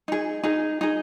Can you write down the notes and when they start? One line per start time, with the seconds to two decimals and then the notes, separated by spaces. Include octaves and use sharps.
0.08 D#4 G#4
0.43 D#4 G#4
0.81 D#4 G#4